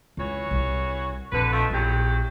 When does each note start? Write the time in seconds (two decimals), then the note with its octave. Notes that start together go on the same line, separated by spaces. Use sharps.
0.17 C#2 E3 F#4 C#5
0.51 C2
1.32 A#1 F2 D3 B4
1.52 F3 A3 D#4
1.70 A#1 E2 F#3 G4